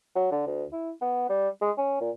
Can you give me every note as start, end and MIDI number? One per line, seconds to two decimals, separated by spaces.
0.16 0.27 54
0.32 0.42 50
0.47 0.64 38
0.72 0.91 64
1.01 1.28 59
1.29 1.49 55
1.62 1.71 56
1.78 1.98 61
2.01 2.10 46